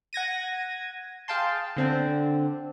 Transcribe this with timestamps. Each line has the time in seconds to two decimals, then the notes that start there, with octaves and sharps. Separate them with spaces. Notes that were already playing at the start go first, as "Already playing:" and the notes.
0.13 F#5 G#6 A#6 D#7
1.28 G#4 F5 G5 A5 C6
1.77 D3 C4 D4